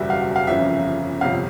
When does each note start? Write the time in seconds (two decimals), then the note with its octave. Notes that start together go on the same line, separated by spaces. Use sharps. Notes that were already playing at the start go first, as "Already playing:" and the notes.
Already playing: F#1 E2 B2 G3 E5
0.10 F5
0.36 F5
0.47 G1 F2 C#3 E3 E5
1.21 G1 F2 C3 F5